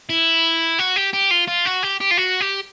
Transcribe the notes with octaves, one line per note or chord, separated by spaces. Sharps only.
E4
F#4
G4
G4
F4
F4
F#4
G4
G4
F4
F#4
G4